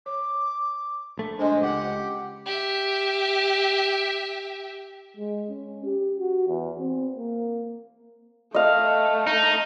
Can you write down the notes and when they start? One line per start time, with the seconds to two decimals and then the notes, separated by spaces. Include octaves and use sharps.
0.06 C#5 D6
1.17 A#1 A3
1.39 G#3 D4 C5 D#5
1.62 C#2 G4 F#5
2.46 G4 E5
5.17 G#3
5.50 C#4
5.84 G4
6.20 F#4
6.48 E2
6.79 C4
7.16 A#3
8.54 A3 D#5 F5
9.27 D#4